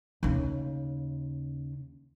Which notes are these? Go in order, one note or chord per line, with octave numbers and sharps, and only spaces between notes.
D#2 C#3